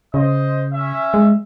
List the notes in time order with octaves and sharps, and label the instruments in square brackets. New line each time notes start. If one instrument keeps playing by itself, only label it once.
[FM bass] C#3 [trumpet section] C5 D#5
[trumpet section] C#4 E5
[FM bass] G#3